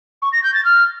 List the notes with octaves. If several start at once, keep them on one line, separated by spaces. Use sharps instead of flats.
C#6
A#6
G6
A6
F6